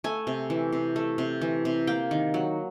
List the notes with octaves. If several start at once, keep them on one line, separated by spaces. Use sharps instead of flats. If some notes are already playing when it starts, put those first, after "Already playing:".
A3 G#5
C3
E3
C3
A3
C3
E3
C3
A#3 G5
D#3
F#3